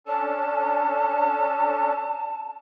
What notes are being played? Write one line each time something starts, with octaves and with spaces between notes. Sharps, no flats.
C#4 D4 A4 A5